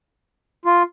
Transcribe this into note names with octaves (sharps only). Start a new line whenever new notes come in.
F4